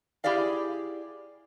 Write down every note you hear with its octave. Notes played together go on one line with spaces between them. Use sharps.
E4 G4 G#4 D5 F5